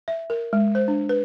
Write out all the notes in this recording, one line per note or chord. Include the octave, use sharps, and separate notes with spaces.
E5
A#4
G#3
C5
D4
B4